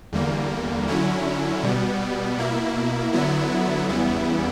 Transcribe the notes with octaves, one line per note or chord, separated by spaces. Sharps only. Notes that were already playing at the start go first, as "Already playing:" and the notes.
E2 D3 G3 A#3
D3 F#3 C#4 E4
B2 G3 B3
B2 A#3 E4
D3 F#3 B3 E4
E2 C#3 G3 B3 E4